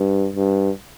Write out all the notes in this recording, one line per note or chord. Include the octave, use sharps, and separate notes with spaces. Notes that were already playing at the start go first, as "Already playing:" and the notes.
Already playing: G2
G2